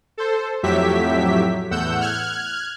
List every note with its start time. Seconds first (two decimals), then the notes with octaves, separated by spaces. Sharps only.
0.18 A4 C5
0.63 F2 A2 F#3 G4 E5 B6
1.71 E2 A2 F#5 E6 G6
2.00 F6 F#6 G#6